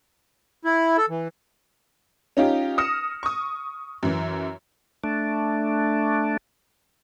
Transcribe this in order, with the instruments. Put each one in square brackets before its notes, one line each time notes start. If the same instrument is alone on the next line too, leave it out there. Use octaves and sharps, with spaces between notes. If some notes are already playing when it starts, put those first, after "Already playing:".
[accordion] E4
A4
E3
[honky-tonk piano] C#4 D#4 F4 G4
D#6 F6 A#6 C#7 E7
C#6 D#6
F#2 E3
[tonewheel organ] A3 D4